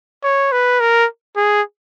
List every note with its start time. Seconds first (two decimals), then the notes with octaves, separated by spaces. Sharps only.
0.23 C#5
0.52 B4
0.80 A#4
1.36 G#4